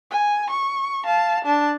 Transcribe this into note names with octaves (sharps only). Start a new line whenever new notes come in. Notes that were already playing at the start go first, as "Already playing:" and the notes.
G#5
C#6
F5 A5
D4 A5